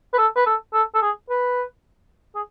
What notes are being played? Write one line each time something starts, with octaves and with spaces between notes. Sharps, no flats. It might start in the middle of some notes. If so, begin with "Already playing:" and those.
B4
A4
B4
A4
A4
A4
G#4
B4
G#4